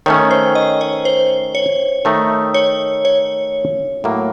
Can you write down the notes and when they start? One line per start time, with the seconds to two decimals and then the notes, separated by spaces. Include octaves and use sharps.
0.06 D#3 A3 C#4 C#5
0.31 C5
0.55 D#5
0.81 C#5
1.05 C5
1.55 C#5
2.05 D#3 A3 D#4
2.54 C#5
3.05 C#5
4.04 A2 F#3 A#3